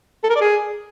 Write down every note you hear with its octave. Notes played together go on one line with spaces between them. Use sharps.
A4
A#4
D5
G#4